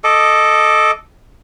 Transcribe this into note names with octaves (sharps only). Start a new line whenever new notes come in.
A4 D#5 D6